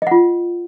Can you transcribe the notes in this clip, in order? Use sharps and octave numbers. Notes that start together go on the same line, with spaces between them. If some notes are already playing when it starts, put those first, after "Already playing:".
F4 D#5 F#5